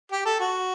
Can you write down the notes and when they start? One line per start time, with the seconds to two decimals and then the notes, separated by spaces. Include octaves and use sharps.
0.12 G4
0.25 A4
0.40 F#4